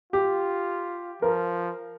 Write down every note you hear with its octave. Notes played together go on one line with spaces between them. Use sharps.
F4 G4
F3 A#4